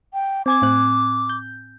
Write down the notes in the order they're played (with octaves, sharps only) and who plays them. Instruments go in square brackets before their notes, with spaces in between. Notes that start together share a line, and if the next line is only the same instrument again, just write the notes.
[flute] G5
[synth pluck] C4 G#5 G#6 [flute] D6
[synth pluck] A2 C4 F#6
G6